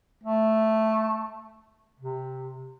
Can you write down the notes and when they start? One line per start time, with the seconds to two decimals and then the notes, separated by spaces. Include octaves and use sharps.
0.24 A3
2.00 C3